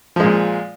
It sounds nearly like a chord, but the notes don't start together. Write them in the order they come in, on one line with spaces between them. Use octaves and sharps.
F3 G#3 A#2